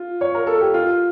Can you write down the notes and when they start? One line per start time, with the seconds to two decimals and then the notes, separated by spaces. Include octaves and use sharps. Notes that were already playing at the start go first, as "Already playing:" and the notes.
Already playing: F4
0.21 C#5
0.35 A#4
0.47 A4
0.61 G4
0.74 F4